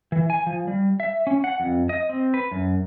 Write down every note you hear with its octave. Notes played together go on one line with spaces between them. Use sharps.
E3
G#5
F3
G3
E5
C#4
F#5
F2
D#5
C4
B4
F#2